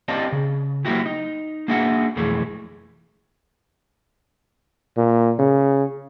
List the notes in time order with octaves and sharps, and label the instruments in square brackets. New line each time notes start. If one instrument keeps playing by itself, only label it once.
[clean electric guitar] C4 G4 D5 D#5 F5 A5
C#3
F#3 A#3 D#4 E4 F#4 G4
D#4
A#3 D4 F#4 G#4 E5 F#5
B1 F2 E3 A3 G#4
[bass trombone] A#2
C#3